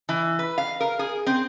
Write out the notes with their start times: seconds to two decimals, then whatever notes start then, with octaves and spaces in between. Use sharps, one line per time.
0.09 E3
0.39 B4
0.58 F5
0.80 A#4
0.99 G#4
1.26 C4